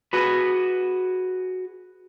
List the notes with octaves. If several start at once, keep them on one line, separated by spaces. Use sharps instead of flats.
F#4 G#4 B4